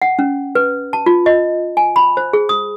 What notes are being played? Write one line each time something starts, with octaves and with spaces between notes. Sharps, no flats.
F#5
C#4
B4
A5
F4
D#5
G#5
B5
C5
G#4
D#6